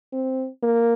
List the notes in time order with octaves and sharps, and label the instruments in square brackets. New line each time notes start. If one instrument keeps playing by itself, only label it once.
[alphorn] C4
A#3